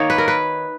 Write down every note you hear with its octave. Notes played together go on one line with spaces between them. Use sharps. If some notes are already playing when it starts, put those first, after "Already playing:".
Already playing: D#3 A#3 D#4 C#5
B4
A#4
B4